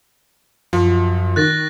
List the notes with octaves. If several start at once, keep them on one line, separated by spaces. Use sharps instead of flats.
F#2 F3
D#3 F#6 A6 A#6